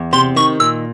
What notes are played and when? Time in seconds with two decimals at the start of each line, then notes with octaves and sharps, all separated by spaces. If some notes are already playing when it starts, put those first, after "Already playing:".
Already playing: E2
0.13 C3 C6
0.36 D#3 C#6
0.60 A#2 E6